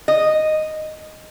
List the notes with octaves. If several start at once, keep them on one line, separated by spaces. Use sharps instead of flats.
D#5